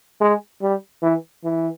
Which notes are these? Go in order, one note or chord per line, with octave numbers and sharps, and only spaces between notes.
G#3
G3
E3
E3